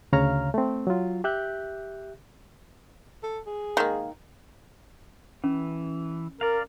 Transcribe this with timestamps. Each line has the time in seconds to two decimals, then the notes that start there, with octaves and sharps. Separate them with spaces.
0.13 D2 C#3 C#5 F5 A#5 F6
0.54 A3 C4
0.87 F#3 F4
1.24 G4 E5 F#6 G6
3.23 A4
3.46 G#4
3.77 D#3 G#3 A#3
5.44 E3 C#4
6.41 A#4 D5 F5